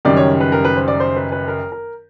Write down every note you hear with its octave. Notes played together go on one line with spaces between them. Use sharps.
F#1 F#2 D#3 G3 D5
C#5
B4
A#4
B4
C5
D5
C5
B4
B4
A#4
A#4